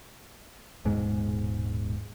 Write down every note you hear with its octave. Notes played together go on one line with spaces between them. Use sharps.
D#1 G#2 B2 G#3